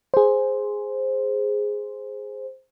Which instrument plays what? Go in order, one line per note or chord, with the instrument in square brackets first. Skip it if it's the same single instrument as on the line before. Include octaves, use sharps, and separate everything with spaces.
[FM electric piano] G#4 C5